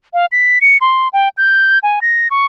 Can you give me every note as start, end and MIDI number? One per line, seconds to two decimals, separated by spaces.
0.14 0.26 77
0.32 0.59 95
0.61 0.77 97
0.81 1.08 84
1.13 1.29 79
1.37 1.79 91
1.83 2.00 80
2.02 2.28 94
2.31 2.46 85